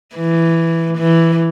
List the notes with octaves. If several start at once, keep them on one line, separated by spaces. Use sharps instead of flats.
E3
E3